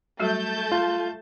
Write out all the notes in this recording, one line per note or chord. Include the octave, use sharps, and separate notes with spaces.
F#3 G3 A3 F#4 A5 G6
F4